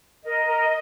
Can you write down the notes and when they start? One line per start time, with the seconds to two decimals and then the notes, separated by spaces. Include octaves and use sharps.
0.23 A#4 D#5
0.46 A#4